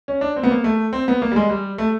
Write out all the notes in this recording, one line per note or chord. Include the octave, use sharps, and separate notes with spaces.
C#4
D4
C4
B3
A#3
A3
C4
B3
A#3
G3
G#3
G3
A3